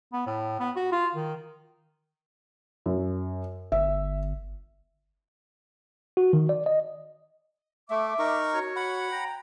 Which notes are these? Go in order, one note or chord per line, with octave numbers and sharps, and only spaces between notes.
B3
A2
B3
F#4
F4
D#3
F#2
G1 E5
F#4
D#3
D5
D#5
A3 E5 D6
D#4 A#4 C#6
F#4 C#5
F#5 B5
G5 A#5